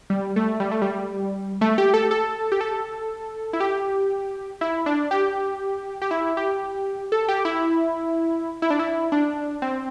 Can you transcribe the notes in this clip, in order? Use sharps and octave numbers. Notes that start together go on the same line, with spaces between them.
G3
A3
G3
A3
G3
A3
G4
A4
A4
G4
A4
E4
G4
E4
D4
G4
G4
E4
G4
A4
G4
E4
E4
D4
E4
D4
C4